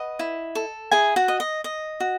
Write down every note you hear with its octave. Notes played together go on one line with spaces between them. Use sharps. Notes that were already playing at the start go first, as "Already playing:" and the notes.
Already playing: B4 D#5 F#5
E4
A4
E4 G#4 G#5
F#4 F#5
D#5
D#5
D#5
F#4